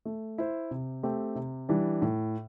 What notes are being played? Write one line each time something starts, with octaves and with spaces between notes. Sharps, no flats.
A3
E4 C5
C3
A3 C4 G4
C3
E3 G3 D4
A2